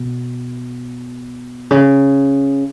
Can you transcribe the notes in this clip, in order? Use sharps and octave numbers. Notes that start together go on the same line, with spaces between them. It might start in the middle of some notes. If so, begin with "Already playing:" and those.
Already playing: B2
C#3